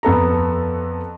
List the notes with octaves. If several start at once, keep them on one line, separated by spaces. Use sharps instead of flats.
F2 B3 A4 A#5